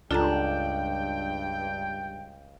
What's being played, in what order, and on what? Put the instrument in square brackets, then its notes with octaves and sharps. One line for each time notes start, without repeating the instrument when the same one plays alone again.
[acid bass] C#2 [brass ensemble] G2 G5 [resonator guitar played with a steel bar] D4 [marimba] F4 A4 A#5